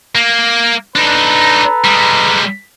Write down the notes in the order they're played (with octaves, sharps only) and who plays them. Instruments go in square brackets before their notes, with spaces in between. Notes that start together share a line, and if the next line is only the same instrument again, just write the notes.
[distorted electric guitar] A#3
[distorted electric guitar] D4 D#4 [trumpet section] A4 B4 A#5
[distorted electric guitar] G3 G#3